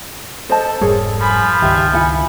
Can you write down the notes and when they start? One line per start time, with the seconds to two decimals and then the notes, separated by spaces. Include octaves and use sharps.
0.49 A4 C5 D#5 A5
0.81 F1 G#2 G3 G#4 A#4 C#5
1.21 F3 G#5 B5
1.62 C#2 G2 D#3 G4 E5
1.93 E4 F4 F#5 G#5 B5